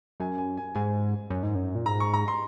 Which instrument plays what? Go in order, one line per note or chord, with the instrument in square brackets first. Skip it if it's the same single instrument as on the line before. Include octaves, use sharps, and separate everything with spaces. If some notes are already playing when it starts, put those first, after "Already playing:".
[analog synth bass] F#2 [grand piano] G#5
[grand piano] G#5
G#5
[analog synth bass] G#2 [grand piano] G#5
[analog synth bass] F#2
G#2
F#2
A#2
[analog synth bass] G#2 [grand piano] A#5
[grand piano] C#6
A#5
C6